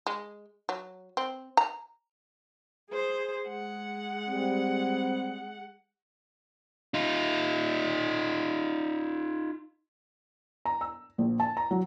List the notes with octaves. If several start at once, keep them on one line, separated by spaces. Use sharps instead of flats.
G#3
F#3
C4
A#5
G#4 C5
G#3 F#5
G3 C4
D#4 F4
A#5
E6
A#1
A5
A#5
F#3